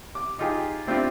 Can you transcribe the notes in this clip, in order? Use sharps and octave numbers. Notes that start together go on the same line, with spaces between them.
D6
D#3 D#4 F4 G4 G#4
A3 C4 D4 E4 F4 G4